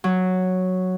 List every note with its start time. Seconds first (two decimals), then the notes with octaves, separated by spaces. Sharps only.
0.04 F#3